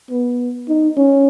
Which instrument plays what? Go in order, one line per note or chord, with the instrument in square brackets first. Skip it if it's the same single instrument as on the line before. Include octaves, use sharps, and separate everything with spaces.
[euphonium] B3
D#4
C#4